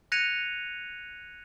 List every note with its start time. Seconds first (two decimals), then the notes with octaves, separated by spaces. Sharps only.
0.12 F#6 G#6 A#6 C#7 D#7 F7